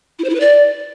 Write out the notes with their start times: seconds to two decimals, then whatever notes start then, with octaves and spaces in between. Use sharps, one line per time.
0.19 E4
0.24 C5
0.30 E4
0.35 B4
0.40 D5